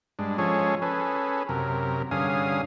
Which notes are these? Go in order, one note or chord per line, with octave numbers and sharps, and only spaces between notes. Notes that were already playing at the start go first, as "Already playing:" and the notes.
G2 G#3 D4
F3 G#3 C#4 G#4 A4 C#5
C#4 G#4 A4 B4
F#2 C3 A#4
G2 D3 C#4 G#4 F5 D#6